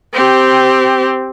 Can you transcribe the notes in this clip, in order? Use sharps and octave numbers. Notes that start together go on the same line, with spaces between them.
C4 G4